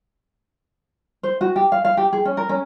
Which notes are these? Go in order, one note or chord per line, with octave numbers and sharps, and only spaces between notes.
C5
F#4
G4
F5
F5
G4
G#4
C#4
A#4
C#4